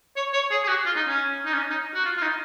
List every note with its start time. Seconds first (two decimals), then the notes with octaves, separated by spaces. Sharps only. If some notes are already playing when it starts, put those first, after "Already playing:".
0.16 C#5
0.33 C#5
0.51 G#4
0.64 G#4
0.68 F#4
0.85 F4
0.96 D#4
1.07 C#4
1.45 D#4
1.53 C#4
1.70 D#4
1.94 F#4
2.05 F4
2.17 F4
2.22 D#4